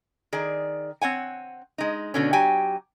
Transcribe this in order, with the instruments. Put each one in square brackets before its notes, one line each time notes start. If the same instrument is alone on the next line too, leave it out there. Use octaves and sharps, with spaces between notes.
[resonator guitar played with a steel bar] D#3 G#4 D5
C4 C#5 F#5 G#5
G#3 D#4
B2 D3 C#4
F#3 G4 G5 G#5